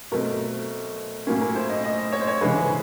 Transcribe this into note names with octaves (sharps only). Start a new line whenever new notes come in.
B2 F#3 A3 C4 A#4
A2 F#3 A#3 C#4
A#4
C5
D#5
D#5
C#5
C5
C#5
C#3 E3 G#3 B4